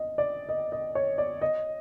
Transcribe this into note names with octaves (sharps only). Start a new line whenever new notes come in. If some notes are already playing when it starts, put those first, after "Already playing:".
Already playing: D#5
D5
D#5
D#5
C#5
D5
D#5